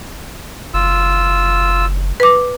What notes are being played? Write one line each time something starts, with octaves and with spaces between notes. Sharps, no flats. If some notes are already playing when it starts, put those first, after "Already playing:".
F#1 F4 E6
B4 D6